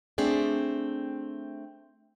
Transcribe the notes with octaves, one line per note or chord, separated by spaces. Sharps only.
A3 C4 D4 G#4 D5